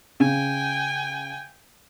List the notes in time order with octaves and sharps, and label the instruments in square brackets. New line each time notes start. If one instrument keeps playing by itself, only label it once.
[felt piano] C#3 [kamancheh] G5 G#5